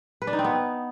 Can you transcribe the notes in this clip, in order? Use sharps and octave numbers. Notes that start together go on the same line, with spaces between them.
B4
D4
D#4
C4
B3